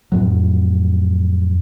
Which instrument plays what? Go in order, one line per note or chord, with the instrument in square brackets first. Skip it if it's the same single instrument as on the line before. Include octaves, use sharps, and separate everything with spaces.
[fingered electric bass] F2 A2 F#3